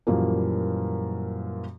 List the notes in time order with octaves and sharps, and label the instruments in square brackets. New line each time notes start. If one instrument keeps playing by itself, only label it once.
[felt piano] F#2 A#2 E3 F3 G3 A#3